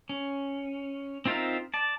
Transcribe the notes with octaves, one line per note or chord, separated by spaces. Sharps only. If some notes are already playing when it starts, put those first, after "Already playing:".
C#4
C4 D#4 F4 A#4 E5
D5 A5